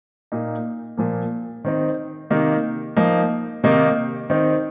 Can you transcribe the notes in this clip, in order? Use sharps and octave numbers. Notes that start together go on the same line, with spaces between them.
A#2 A#3 D#4
A#2 F3 A#3
D#3 C4 D#4
C3 D#3 A#3 D#4
F3 A#3 D#4
C3 D#3 A#3 D#4
D#3 C4 D#4